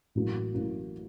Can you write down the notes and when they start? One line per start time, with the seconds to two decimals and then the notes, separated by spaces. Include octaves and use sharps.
0.15 A1 A2 F#3 A#3
0.54 A1 A2 F#3 A#3